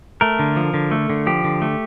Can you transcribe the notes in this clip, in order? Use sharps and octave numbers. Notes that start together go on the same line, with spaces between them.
A3 A#4
D3
F3
D3
A3
D3
F3 G4
D3
A3